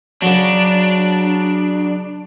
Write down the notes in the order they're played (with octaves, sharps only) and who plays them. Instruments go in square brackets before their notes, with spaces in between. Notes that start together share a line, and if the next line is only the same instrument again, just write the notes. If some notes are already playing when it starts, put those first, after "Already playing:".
[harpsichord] C#3 F#3 [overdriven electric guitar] D4